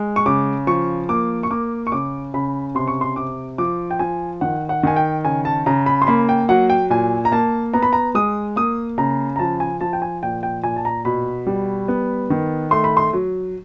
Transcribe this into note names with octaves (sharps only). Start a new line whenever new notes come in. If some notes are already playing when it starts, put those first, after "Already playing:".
Already playing: G#3
C#6
C#3 D6
F3 C#6
A#3 D6
C#6
A#3 D6
C#6
C#3 D6
C#3 B5
C3 C6
C#6
C6
C3 D6
F3 D6
G5
F3 G#5
D#3 F#5
F#5
D#3 G#5
G5
C#3 G#5
A5
C#3 A#5
B5
C6
A#3 B5
G5
F#3 F#5
G5
A#2 G#5
A#5
A#3 A5
B3 A#5
B5
A#5
G#3 D#6
A#3 D#6
C#3 A#5
A#5
F3 A5
G#5
F3 A5
G5
G#5
A#2 G5
G5
A#2 G#5
A5
A#5
B2 B5
G3
B3
D#3
A3 C6
B5
C6
F#3